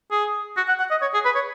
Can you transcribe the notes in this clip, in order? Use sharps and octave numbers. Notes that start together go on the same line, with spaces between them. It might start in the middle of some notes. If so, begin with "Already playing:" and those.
G#4
F#4
F#5
F#5
D#5
C#5
G#4
B4
C#5